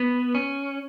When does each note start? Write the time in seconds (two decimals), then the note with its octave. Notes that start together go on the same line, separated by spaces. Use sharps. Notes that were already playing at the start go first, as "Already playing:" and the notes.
Already playing: B3
0.35 C#4